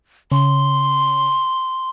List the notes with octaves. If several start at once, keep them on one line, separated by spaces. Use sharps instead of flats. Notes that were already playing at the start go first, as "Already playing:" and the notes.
C#3 C6